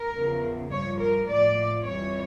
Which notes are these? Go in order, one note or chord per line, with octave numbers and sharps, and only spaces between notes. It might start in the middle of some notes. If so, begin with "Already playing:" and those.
Already playing: A#4
E2 C#3 F3
G2 F3 C#5
A#4
A2 F3 D5
F2 E3 G3 C#5